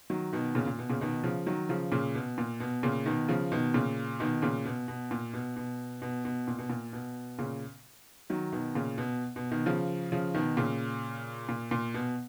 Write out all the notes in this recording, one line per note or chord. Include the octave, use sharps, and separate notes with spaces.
D#3 F#3
B2 D#3
A#2 C#3
A#2
B2
A#2 C#3
B2 D#3
C#3 F3
D#3 F#3
C#3 F3
A#2 C#3
B2
A#2
B2
A#2 C#3
B2 D#3
C#3 F3
B2 D#3
A#2 C#3
B2 D#3
A#2 C#3
B2
B2
A#2
B2
B2
B2
B2
A#2
B2
A#2
B2
A#2 C#3
D#3 F#3
B2 D#3
A#2 C#3
B2
B2
B2 D#3
C#3 F3
C#3 F3
B2 D#3
A#2 C#3
A#2
A#2
B2